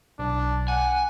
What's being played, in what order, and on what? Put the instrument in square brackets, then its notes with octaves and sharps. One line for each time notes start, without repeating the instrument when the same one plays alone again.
[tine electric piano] B1 [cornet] D4
[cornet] F#5 [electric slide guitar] G#5